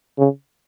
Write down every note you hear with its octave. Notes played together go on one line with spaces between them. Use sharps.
C#3